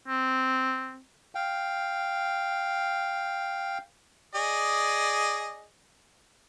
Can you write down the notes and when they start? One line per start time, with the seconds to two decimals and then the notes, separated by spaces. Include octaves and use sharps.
0.08 C4
1.35 F5 G5
4.35 G#4 D5 D#5